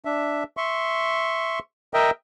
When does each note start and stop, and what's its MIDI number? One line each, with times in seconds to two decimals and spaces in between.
0.05 0.43 62
0.05 0.43 76
0.57 1.59 76
0.57 1.59 84
0.57 1.59 85
1.94 2.11 70
1.94 2.11 75
1.94 2.11 76
1.94 2.11 79